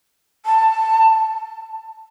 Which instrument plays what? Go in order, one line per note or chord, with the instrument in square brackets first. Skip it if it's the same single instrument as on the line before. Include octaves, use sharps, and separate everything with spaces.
[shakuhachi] A5